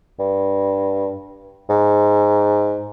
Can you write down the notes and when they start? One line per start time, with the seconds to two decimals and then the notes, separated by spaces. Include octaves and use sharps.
0.19 G2
1.70 G#2